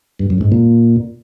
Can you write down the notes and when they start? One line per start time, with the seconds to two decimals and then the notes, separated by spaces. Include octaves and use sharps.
0.19 G2
0.30 F#2
0.41 G#2
0.52 A#2